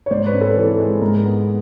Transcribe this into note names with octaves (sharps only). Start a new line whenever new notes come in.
C#5
G#2 C5 D5
B4 C#5
C4
A4 B4
E3
G#3
G#2 A#4
B3